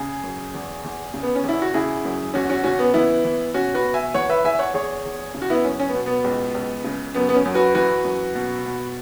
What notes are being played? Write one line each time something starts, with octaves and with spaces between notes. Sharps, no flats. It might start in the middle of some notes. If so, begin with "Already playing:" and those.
Already playing: C#3 G#4
F#2
E2
E2
C#3
B3
C#4
E2 E4
F#4
C#3 E4 G#4
F#2
E2 C#4 F#4
C#4 F#4
C#3 C#4 F#4
B3
E3 B3 E4
E3
B2 C#4 F#4
F#4 B4
B2
E5 G#5
E3 C#5 F#5
B4 E5
E2 E5 G#5
C#5 F#5
E2 G#4 C#5
E2
C#3
F#4
B3 E4
F#2 C#4
C#4
B3
B2
B3
C#2
C#2
C#3
F#2 B3
B3
C#4
F#2
F#4 B4
E3 F#4 B4
F#2
B2
B2